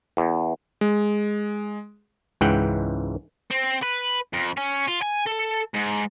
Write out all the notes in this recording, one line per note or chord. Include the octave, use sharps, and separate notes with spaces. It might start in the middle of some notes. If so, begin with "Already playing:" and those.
E2
G#3
C#2 G#2 E3 F#5 G5
C4
B4
F2
C#4
F4
G#5
A4
G#2